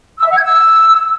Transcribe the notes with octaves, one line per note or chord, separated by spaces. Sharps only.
E6
E5
F#5
G#6
E6